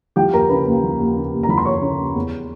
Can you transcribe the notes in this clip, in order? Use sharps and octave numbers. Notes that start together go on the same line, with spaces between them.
F3 G4 G5
D#2 A#4 A#5
C#3 B4 B5
D#2
F3
D#2
C#3
D#2
A#5
F3 B5
C6
D#2 C#5 C#6
C#3
D#2
E2